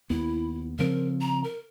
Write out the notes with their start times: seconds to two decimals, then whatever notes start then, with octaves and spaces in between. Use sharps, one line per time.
0.10 D#2 B3 E4
0.79 C#3 F3 C4 A#4
1.21 A#5
1.44 A#4